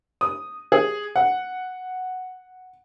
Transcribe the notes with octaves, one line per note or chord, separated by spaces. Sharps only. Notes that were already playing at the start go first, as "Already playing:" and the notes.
D#6
G#4
F#5